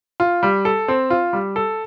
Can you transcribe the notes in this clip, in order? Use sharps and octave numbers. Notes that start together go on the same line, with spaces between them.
F4
G3
A4
C4
F4
G3
A4